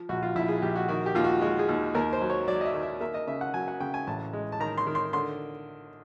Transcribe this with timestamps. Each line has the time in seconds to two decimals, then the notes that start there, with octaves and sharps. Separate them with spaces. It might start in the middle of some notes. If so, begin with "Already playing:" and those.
Already playing: F3
0.09 A#1 F#4
0.23 F4
0.35 A#1 E4
0.48 G#4
0.62 A#1 G4
0.76 F#4
0.89 D#3 F#4
1.06 G4
1.15 D#2 F4
1.24 F#4
1.42 G#3 F#4
1.59 G#4
1.69 D#2
1.95 D#2 A#4
2.13 C5
2.21 F#3
2.30 C#5
2.48 F#3 D5
2.61 D#5
2.65 E5
2.74 D#3
2.83 E5
3.01 A#3 E5
3.14 D#5
3.27 C#3 E5
3.41 F#5
3.54 F#3 G#5
3.68 F#5
3.80 C#3 G5
3.94 G#5
4.07 A1 A5
4.33 G#3
4.52 A5
4.60 D#3 A#5
4.78 C6
4.87 D#3
4.95 C6
5.13 D3 C6